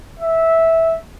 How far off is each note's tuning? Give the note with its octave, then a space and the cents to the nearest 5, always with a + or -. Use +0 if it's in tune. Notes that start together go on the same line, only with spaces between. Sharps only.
E5 -10